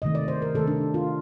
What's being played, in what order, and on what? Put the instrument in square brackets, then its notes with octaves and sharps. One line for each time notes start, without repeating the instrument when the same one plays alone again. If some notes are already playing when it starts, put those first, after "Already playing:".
[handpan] C3 D#3 A3 D#5
D5
C5
A#4
C3 D#3 A3 A4
D4
F4